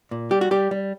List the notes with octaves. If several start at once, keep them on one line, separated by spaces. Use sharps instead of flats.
A#2
G3 G4
F#4
G3 G4
G3